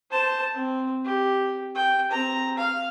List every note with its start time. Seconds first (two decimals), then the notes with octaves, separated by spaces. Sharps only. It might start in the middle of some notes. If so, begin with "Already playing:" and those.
0.11 C5 A5
0.54 C4
1.05 G4
1.75 G5
2.11 C4 A#5
2.58 F5